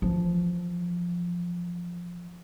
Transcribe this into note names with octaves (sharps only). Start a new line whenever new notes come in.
E3 F3